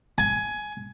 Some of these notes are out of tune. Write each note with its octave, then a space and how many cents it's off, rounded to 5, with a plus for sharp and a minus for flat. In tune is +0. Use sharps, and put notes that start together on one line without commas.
G#5 +15